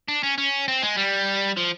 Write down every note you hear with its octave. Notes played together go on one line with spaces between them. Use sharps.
D4
C#4
C#4
C4
G#3
G3
F3